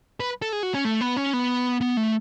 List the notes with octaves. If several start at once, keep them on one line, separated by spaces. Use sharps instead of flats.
B4
A4
G#4
F#4
C#4
A3
B3
C#4
B3
B3
A3